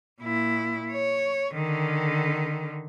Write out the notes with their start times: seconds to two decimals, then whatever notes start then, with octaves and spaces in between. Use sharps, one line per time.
0.21 A#2 E4
0.91 C#5
1.54 D3 D#3